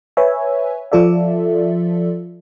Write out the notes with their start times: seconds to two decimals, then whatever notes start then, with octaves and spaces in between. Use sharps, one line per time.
0.17 B4 C#5 E5 G#5
0.92 F3 F4 A4 D5 E5